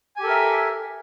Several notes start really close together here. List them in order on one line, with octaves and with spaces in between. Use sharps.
G#5 G4 A4 A#4 E5